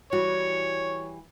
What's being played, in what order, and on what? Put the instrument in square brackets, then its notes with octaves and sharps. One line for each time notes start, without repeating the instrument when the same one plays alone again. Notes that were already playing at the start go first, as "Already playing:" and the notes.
[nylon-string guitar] E3 G3 F#4 [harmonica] C#5